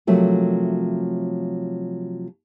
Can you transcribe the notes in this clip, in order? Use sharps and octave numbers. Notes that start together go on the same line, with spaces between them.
C3 F3 F#3 A3 A#3